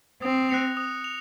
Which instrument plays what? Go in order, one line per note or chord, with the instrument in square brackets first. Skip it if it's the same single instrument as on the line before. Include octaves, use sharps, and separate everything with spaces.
[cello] C4 [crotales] D#6
[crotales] F#6 A#6 C#7 F7
D#6
F7